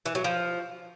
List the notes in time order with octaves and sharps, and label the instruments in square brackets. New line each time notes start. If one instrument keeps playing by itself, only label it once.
[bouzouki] E3
F#3
F3